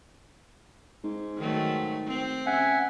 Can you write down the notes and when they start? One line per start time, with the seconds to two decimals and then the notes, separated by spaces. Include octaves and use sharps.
1.04 G#2
1.38 D#3 F#3 A3
2.07 C4
2.46 C#3 E5 F#5 G#5